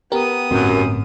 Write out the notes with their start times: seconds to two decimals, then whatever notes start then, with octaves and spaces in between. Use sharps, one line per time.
0.12 B3 G4 A#4 D#6
0.51 G1 F#2 A2 C4